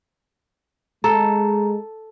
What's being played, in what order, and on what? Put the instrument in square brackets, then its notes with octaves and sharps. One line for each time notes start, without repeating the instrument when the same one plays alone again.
[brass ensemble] G#3 [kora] A4 [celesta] A#5